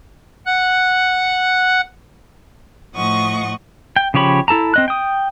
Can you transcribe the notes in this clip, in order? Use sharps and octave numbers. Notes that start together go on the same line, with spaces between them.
F#5 F#6
A2 F3 D#5 F#5 C#6
G5
C#3 F3 G4 C#5 B5
E4 A4 A5 A#5
C4 D#5 F#6
G5 D#6